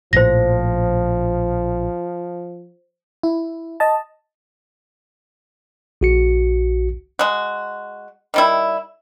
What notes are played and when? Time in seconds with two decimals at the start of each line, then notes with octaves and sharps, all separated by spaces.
0.13 A#1 A2 F3 C5 A#6
3.23 E4
3.80 D#5 A5
6.01 A#1 F#4 C#7
7.19 G#3 F#4
8.34 D#3 G3 E4